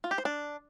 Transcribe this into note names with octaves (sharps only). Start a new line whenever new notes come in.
F4
G4
C5
D4